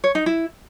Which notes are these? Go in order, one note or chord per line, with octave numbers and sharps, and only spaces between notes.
C#5
D#4
E4